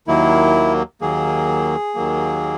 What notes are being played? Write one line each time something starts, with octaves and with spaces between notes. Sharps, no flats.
D#2 D#3 F#3 A#3 E4
D#2 D#3 F#3 A#3 G#4
D#2 D#3 F#3 A#3